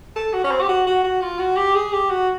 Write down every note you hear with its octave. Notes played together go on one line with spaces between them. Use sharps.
A4
F#4
C#4
C4
G4
F#4
F#4
F#4
F4
F#4
G4
G#4
G4
F#4